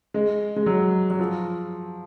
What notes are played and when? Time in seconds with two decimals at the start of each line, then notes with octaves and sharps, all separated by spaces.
0.14 G#3
0.56 G#3
0.66 F#3
1.10 F#3
1.20 F3